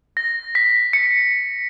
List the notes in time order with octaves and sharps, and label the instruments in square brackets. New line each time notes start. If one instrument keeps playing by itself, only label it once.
[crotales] A#6
B6
C#7